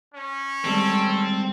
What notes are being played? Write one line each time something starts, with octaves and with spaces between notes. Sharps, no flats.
C#4
D#3 G3 G#3 C4 A4